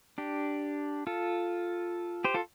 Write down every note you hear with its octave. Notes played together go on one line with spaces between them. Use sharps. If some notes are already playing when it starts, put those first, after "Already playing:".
D4 G4
F4 A4
G4 C5
F4 A4